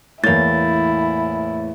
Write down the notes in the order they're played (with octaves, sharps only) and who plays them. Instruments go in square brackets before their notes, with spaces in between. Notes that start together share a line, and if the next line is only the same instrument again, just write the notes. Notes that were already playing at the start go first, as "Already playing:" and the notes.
[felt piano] E2 C#5 G6 [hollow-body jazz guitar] A2 A#3 [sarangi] E4 [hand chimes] A6